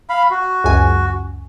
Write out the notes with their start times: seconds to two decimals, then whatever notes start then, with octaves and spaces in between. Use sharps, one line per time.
0.10 F5 B5
0.31 F#4
0.64 C#2 F#2 G#5